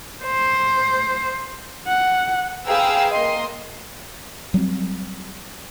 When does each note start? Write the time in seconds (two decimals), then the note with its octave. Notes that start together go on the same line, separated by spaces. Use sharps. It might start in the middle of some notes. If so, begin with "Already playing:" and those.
0.24 C5
1.88 F#5
2.67 G#4 B4 F5 G5 A#5 E6
3.11 A#3 D#5 C6
4.54 F#3 G3 A#3 C4